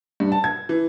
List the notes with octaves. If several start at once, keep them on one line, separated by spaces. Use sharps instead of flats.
G2
A5
G#6
E3